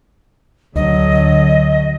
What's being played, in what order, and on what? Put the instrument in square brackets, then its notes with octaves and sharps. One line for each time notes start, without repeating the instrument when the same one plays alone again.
[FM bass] D2 [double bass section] D3 F#3 [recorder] D#5